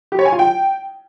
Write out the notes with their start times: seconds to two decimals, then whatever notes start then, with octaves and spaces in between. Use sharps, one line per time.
0.12 G4
0.19 C#5
0.25 G#5
0.32 F4
0.39 G5